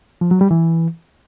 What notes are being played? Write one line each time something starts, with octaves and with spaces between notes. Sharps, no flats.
F3
F#3
G3
E3